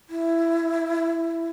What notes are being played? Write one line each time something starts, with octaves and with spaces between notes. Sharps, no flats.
E4